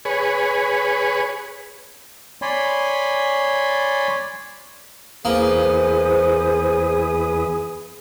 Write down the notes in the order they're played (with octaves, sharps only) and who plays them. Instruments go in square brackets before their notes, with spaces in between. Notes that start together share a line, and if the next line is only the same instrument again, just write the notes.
[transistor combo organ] G#4 B4 C#5
[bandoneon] C#5 D5 G#5 B5 C6
[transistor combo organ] E2 B4 D#6 [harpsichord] A#3 [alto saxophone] G#4 [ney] C5